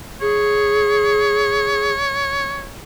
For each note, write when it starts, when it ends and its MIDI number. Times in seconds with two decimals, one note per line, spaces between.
0.21 1.92 68
0.21 2.69 73